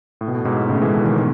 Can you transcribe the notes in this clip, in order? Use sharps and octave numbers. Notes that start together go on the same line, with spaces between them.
A2
B2
A2
G#2 B2
A2 C#3
A3
E3 G#3
B2 D#3
B2 D#3
B2 D#3